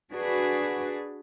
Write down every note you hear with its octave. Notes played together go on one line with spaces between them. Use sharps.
D4 F#4 G#4 B4